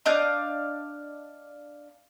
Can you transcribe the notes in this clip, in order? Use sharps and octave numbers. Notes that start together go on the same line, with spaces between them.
D4 D#5 F5 G6